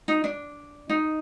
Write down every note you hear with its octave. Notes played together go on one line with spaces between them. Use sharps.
D#4
D4
D#4